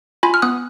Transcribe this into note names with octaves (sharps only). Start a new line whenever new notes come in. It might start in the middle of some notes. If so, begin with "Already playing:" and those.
F4 G#5 B5
F6
B3 D#6 F#6